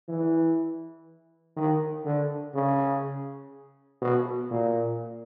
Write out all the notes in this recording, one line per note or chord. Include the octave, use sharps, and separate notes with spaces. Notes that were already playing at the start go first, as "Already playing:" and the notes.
E3
D#3
D3
C#3
B2
A#2